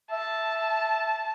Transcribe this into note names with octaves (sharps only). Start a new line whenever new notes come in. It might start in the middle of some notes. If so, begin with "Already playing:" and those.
E5 A5